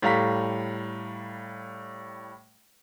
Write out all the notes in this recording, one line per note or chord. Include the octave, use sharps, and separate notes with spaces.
A2 G3 F5 A#5 B6